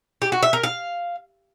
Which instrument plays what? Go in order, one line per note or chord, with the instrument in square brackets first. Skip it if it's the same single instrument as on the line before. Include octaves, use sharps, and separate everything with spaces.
[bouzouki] G4
F#4
E5
A#4
F5